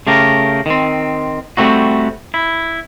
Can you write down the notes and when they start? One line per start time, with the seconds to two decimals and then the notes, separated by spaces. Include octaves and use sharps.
0.07 C#3 A3 G4 A#4
0.66 D#3 C4
1.57 G3 A3 C4 D#4 F#4
2.34 E4